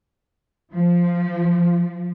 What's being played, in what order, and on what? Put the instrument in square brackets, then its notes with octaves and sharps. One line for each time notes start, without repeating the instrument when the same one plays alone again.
[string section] F3